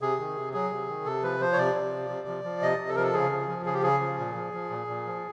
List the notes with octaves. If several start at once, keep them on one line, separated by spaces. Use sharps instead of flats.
C3 G#4
D#3
C3
F#3 G#4
C3
D#3
C3 A4
F3 B4
F3 C5
C#5
C3 D5
C3
F3
C3
F3
F3
C3 D#5
C3
A4
F3 A#4
A4
C#3 G#4
F3
F3
C#3 G#4
G4
C#3 G#4
F3
A#2
F3
F3
A#2
A#2
F3